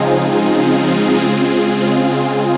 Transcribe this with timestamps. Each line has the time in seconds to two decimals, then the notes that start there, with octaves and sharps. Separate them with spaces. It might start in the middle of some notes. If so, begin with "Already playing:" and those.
Already playing: C#3 F3 G#3 C4 D#4 F4 G#4
1.15 C#3 G#3 C4 F4 G#4
1.80 F4 G#4